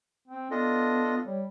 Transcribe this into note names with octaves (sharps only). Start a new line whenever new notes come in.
C4
B3 D4 F4 A4 D#5
G3 C#5